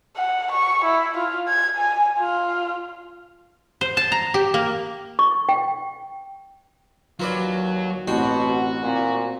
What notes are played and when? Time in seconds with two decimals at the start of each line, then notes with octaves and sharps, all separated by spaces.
0.17 F#5
0.52 C#6
0.85 E4
1.17 F4
1.48 G#6
1.77 G#5
2.19 F4
3.81 C5
3.97 A5
4.12 A#5
4.34 G4
4.54 A#3
5.19 C#6
5.49 G5
7.20 D#2 F#3 F4 B4 D5
8.08 A1 B2 C4 F#4 G5 C6
8.83 A#2 C4